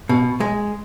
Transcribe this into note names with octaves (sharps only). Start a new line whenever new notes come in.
B2
G#3